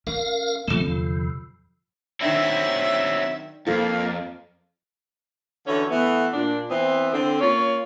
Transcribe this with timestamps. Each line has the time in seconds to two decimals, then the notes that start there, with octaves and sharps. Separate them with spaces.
0.07 C#4 A#4 F5
0.68 D3 F3 A3 C4
0.86 E2 C3
2.21 D#3 F#3 C4 D4 E4 E5
3.67 F2 F3 A#3 F4 A4
5.67 D3 E3 C#4 F#4 C#5
5.90 E3 A3 B3
6.33 A#2 D4
6.69 E3 B3 C4
7.13 D3 C4
7.40 A#3 C#4 F4 C#5